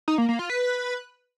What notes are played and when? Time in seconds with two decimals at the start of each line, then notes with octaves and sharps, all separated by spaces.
0.08 D#4
0.18 A#3
0.29 A#3
0.39 F4
0.50 B4